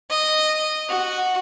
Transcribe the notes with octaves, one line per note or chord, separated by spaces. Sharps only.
D#5
F#4